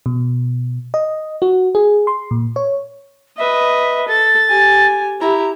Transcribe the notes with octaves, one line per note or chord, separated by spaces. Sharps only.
B2
D#5
F#4
G#4
C6
A#2
C#5
B4 D#5 E5
A4 A6
G4 G#5
E4 G4 A#5